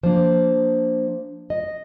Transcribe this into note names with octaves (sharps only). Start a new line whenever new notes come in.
F3 A#3 D4 C5
D#5